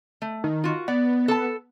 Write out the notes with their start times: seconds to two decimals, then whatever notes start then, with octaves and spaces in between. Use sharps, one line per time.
0.22 A3
0.44 D#3
0.64 F4 F#4
0.88 B3 D5
1.28 A4 A5